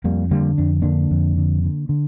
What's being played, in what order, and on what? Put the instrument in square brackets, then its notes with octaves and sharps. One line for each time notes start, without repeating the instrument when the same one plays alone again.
[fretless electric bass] F2 G3 A#3
D3 G3 A#3
F2 D4
D3 A#3 D4
F2
D3
D3
D3